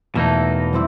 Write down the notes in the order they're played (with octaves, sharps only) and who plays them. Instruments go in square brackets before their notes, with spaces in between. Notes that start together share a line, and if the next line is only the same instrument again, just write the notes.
[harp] E2 A3 [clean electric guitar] B2 A#3 D#4
[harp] G3 C4 E4